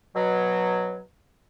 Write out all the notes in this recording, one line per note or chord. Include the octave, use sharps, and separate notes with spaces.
B2 F#3